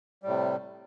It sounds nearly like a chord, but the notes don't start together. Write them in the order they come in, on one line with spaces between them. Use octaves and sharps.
G3 A2 C3